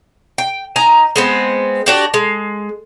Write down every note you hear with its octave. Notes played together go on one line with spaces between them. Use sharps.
G5
D#4 G#5 A#5
G#3 B3 C4
D4 F#4 G4
G#3